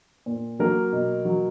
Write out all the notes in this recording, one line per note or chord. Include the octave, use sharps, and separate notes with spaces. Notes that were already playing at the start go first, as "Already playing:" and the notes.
A#2
F#3 A#3 A#4
B2
F#3